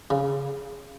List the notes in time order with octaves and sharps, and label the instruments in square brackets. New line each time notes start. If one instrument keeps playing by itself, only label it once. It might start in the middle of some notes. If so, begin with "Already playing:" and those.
[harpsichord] C#3